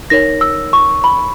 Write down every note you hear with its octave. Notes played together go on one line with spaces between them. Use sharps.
D#4 A#4 C#5 A#6
E6
C#6
B5